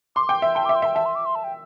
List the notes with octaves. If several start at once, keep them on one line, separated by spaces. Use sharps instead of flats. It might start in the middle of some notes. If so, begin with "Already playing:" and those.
C6 D6
G5 D6
E5 C6
G5 A5
E5 D6
C6
E5 G5
E5 A5
C6
D6
C6
A5
G5